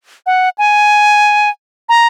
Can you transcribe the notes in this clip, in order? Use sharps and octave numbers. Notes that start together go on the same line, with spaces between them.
F#5
G#5
A#5